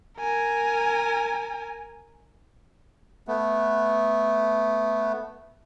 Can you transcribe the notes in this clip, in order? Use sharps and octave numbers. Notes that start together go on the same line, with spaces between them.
A#4 G#5
A3 B3